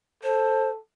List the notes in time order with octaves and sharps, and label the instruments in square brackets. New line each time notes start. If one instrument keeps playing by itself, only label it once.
[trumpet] A4 [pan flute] C5